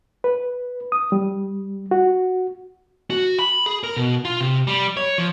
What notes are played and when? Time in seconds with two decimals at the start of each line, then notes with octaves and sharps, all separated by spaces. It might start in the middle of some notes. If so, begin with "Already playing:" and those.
0.24 B4
0.92 D#6
1.12 G3
1.91 F#4
3.10 F#4
3.39 B5
3.66 G#4
3.83 A#4
3.97 B2
4.25 F4
4.41 C3
4.67 G3
4.97 C#5
5.18 F3